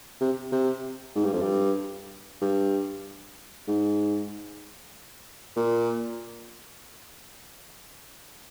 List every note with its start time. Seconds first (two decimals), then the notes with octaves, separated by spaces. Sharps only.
0.21 C3
0.52 C3
1.15 G#2
1.24 G2
1.33 F2
1.42 G2
2.41 G2
3.68 G#2
5.56 A#2